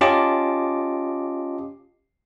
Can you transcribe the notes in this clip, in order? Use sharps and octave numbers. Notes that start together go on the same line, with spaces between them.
C#4 F4 G4 D#5 A5 D6